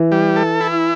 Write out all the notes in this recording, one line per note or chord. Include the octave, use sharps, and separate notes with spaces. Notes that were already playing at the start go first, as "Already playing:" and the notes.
Already playing: E3
G3
A4
E4